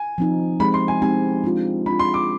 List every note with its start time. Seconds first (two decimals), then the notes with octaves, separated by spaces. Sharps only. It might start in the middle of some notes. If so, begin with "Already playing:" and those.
Already playing: G#5
0.18 F3 C4 D#4
0.60 G#3 C4 D#4 G4 B5
0.74 C6
0.88 G#5
1.02 G#3 C4 D#4 G4 G#5
1.44 G#3 D4 F4
1.86 G#3 D4 F4 B5
1.99 C6
2.14 D6